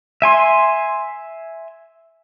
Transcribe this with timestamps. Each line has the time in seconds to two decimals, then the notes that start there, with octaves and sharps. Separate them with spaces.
0.22 E5 G#5 C6